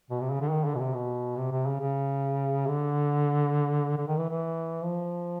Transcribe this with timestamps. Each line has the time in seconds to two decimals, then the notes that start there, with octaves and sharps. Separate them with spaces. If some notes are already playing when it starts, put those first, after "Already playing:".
0.10 B2
0.21 C3
0.31 C#3
0.41 D3
0.51 D#3
0.65 D3
0.75 B2
0.79 C3
0.94 B2
1.37 C3
1.52 C3
1.67 C#3
1.80 C#3
2.68 D3
3.98 D3
4.08 D#3
4.18 E3
4.30 E3
4.84 F3